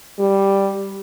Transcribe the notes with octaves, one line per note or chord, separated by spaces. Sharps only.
G3